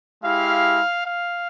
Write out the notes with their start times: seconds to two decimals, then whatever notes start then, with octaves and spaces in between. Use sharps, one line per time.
0.23 G#3 E4 G4 F5
1.04 F5